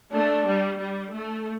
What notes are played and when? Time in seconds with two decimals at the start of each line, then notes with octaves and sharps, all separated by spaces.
0.13 A3 D4
0.46 G3
0.80 G3
1.12 A3